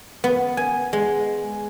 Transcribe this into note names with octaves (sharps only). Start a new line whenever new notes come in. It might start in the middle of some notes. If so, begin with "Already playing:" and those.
B3
G#5
G#3